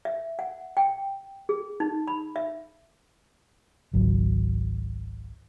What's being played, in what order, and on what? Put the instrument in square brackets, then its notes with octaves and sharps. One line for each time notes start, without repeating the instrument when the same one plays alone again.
[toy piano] E5
F#5
G5
G#4
D#4
B5
E5
[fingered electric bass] G#1 C#2 F#3